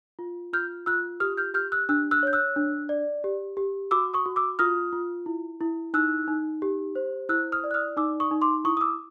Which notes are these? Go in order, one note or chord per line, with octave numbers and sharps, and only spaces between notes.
F4
F4 F6 G6
F4 E6 F#6
G4 D#6 F6
F6 G6
G4 F6 G6
E6 F#6
D4 E6 F#6
E6 F#6
C#5 G6
E6 F#6
D4
D5
G4
G4
F#4 D6 E6
C#6 D#6
F#4
D6 E6
F4 D#6 F6
F4
E4
E4
D#4 E6 F#6
D#4
G4
C5
E4 E6 F#6
D#6 F6
D5
F#6
D#6 F6
D#4 D6 E6
C#6 D#6
D#4
C6 D6
E4 C#6 D#6
D#6
D6 E6